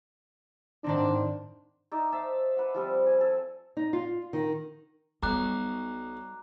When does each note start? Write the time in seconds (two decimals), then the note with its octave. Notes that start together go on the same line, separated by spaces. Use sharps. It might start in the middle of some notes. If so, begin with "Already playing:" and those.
0.84 G#2 D#3 C4 D4
1.92 D#4 D5 E5
2.12 C5 E5 A5
2.57 B4 E5 F#5
2.74 F3 G3 C4
3.06 G#5
3.21 A4
3.77 D#4
3.93 F4
4.33 D#3
5.23 B1 G3 A#5 D6 F#6